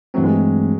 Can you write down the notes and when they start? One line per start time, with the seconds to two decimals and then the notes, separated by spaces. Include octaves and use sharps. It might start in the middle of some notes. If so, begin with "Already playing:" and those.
0.14 G2 E3 F#3 A3 C4
0.24 G#3